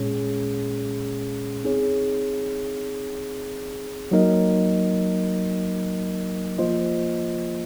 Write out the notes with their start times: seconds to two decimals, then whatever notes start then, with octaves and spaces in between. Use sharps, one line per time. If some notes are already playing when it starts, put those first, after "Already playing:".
Already playing: A#2 G#3 C#4 G#4 C#5
1.64 C4 D#4 G#4 C#5
4.11 F#3 A#3 D#4 A#4 D#5
6.59 F3 A#3 F4 C5 D#5